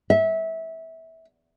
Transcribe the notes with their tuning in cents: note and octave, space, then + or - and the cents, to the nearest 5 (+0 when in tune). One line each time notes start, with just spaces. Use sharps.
E5 -20